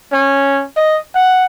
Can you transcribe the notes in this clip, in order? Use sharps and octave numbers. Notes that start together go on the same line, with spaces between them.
C#4
D#5
F#5